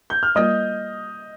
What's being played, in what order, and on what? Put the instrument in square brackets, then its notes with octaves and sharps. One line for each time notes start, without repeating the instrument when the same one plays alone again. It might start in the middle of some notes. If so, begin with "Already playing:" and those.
[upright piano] G6
F6
[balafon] G3 A#3 F4 A#4 D5 [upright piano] D#5 D#6